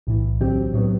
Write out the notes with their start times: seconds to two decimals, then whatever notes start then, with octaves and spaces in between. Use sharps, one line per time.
0.07 B1 A2 E3
0.40 D2 D3 F#3 C4 G4
0.73 A2 F#3 B3